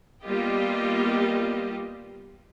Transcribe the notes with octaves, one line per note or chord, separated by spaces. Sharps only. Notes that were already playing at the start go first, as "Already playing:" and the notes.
G3 A#3 B3 F4 G4 D#5